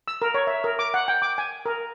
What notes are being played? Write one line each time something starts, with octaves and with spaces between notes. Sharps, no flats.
E6
A#4
C#5
E5
A#4
D6
F#5
G5
D6
G#5
A#4